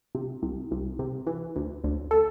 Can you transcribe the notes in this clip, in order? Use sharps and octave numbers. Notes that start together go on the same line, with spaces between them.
C3
C2
C2
C3
E3
D2
D2
A4